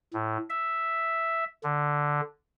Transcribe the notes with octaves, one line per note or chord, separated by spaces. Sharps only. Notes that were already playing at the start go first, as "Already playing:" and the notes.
A2
E5
D3